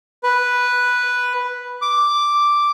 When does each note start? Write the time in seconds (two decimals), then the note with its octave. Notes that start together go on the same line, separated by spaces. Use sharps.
0.23 B4
1.82 D6